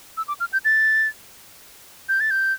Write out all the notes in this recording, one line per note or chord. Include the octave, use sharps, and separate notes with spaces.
E6
D6
F6
G6
A6
G6
A6
G6